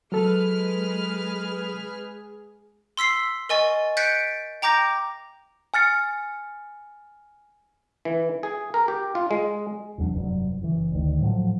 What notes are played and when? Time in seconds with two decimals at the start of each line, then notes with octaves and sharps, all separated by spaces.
0.12 F#3 G#3 G#4 A4 B4 F6
2.97 C6 E6 B6 C7
3.49 A#4 D#5 G#5 C#6 A6
3.97 F#6 G6 A6 B6 C#7 D7
4.62 G5 A#5 D6 G6 A#6
5.74 G#5 F6 A6 C#7
8.05 E3
8.43 G#4
8.74 A#4
8.88 G4
9.15 F4
9.31 G#3
9.98 F1 E2 F#3 D4
10.14 F1 G2 C3 F#3
10.61 F#1 E3
10.92 D2 D#3
11.21 A2 F3 F#3